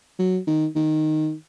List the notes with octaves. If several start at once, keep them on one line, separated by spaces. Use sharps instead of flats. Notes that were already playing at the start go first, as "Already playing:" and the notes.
F#3
D#3
D#3